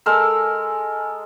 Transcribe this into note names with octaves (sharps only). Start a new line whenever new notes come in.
G#3 A4 A#4 E6